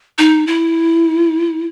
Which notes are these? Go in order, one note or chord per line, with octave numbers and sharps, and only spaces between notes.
D#4
E4